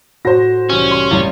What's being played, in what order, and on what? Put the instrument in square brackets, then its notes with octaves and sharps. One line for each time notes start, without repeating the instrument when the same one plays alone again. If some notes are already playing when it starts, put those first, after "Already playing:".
[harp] A2 [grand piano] F#4 [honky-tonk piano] C5 A#6
[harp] C2 E3 G4 [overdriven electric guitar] C#4
[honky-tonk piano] C6
[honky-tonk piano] A1 [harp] C#3 G3 G#3